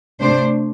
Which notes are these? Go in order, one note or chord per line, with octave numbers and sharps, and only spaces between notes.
C3 A3 D4 C5